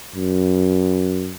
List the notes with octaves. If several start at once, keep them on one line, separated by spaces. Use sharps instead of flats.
F#2